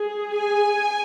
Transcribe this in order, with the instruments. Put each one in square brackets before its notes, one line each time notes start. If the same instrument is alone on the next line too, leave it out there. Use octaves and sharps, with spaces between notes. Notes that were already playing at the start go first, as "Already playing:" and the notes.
Already playing: [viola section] G#4
[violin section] G#5